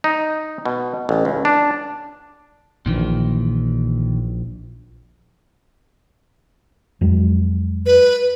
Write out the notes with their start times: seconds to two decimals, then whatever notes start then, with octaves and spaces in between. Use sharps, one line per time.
0.04 D#4
0.65 B2
1.09 A1
1.25 C#2
1.45 D4
2.86 A#1 A#2 D#3 E3
7.01 F2 F#3 G#3
7.86 B4